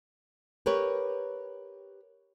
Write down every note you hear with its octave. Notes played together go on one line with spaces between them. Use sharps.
G4 A#4 B4 C#5